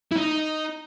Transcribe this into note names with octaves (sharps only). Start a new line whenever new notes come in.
E4
D#4